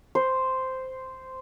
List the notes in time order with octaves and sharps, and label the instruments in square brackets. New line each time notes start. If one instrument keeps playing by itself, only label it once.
[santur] C5